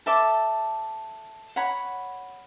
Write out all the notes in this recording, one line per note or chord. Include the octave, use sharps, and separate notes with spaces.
A4 E5 A5 D6
C#5 F#5 B5